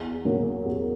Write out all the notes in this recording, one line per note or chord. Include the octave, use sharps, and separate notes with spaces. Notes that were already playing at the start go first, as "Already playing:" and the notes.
Already playing: E2
C#3 F#3 A#3
E2